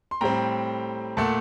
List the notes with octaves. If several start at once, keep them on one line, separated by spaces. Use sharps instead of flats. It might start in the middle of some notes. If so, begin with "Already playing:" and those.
C6
A2 G3 C4 G5 A#5
A#2 A3 F#5 A5